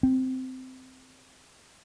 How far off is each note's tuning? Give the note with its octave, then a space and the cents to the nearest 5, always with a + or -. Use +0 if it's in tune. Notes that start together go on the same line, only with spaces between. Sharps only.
C4 -15